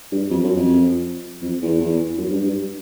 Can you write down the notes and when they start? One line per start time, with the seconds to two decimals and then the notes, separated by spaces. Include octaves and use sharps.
0.12 G2
0.30 F2
0.43 F#2
0.56 F2
1.42 F2
1.62 E2
1.80 E2
2.18 F#2
2.30 G2
2.43 G2